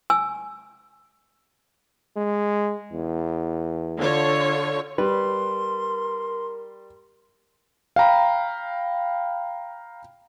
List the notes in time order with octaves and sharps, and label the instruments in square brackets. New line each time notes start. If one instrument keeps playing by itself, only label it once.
[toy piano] G#5 E6
[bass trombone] G#3
E2
[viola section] D3 F4 C#5
[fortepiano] G3 [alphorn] A#4 [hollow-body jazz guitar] B4 [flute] C6
[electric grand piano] F5 G5 A#5 B5